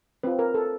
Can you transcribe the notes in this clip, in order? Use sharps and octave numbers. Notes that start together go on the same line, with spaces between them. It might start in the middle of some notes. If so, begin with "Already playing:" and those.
C4 F4 B4
A#4
A4